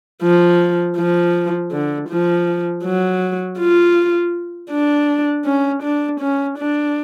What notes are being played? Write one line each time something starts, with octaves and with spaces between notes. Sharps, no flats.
F3
F3
D3
F3
F#3
F4
D4
C#4
D4
C#4
D4